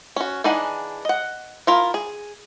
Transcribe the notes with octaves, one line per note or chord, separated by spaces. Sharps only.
C#4 F#4
E3 D4 D#4 G#4 F#5
D#5 F#5
E4 F4 A#4
G#4